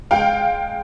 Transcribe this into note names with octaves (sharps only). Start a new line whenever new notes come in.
G#3 F5 G5